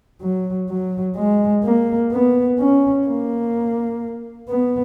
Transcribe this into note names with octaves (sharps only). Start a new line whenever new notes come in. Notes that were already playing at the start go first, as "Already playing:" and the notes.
F#3
F#3
G#3
A#3
B3
C#4
A#3
B3